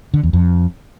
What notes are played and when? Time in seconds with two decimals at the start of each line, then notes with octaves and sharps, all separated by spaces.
0.14 D3
0.23 E2
0.33 F2